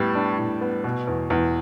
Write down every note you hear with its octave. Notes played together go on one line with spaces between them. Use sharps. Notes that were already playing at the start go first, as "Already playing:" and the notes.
Already playing: A2 G3 B3
D4
A2
B3
B2
E2
E2